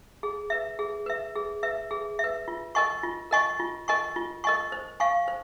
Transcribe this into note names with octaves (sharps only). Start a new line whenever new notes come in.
G#4
B4 E5
G#4
B4 E5
G#4
B4 E5
G#4
B4 E5
F4
A#4 D#5 G#5 C#6
F4
A#4 D#5 G#5 C#6
F4
A#4 D#5 G#5 C#6
F4
A#4 D#5 G#5 C#6
C5
F5 G#5 C#6
C5